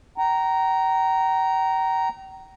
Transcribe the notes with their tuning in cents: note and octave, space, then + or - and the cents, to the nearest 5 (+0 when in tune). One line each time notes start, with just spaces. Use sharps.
G5 -40 A#5 +0